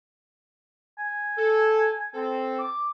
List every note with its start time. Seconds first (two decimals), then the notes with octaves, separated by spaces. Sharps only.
0.99 G#5
1.37 A4
2.14 C4 A4
2.59 D6